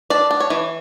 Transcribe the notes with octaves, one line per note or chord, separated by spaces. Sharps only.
D4 D5
D4
C#5
E3